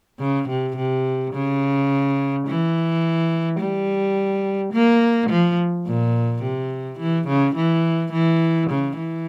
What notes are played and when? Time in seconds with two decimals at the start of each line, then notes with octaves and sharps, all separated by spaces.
0.19 C#3
0.49 C3
0.76 C3
1.33 C#3
2.47 E3
3.59 G3
4.73 A#3
5.30 F3
5.86 A#2
6.43 C3
6.99 E3
7.28 C#3
7.56 E3
8.12 E3
8.70 C#3
8.97 E3